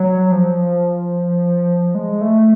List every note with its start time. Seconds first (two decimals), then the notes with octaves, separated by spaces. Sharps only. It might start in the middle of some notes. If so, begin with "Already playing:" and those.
Already playing: F#3
0.32 F3
1.95 G#3
2.21 A3